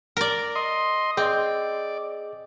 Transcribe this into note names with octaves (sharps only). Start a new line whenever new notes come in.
A#4 D5
D#5 C6
C4 G#4 D5 D#5